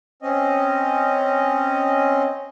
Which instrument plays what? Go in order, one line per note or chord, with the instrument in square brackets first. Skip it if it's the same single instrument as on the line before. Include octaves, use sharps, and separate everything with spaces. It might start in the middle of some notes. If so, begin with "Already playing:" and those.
[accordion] C4 C#4 D#5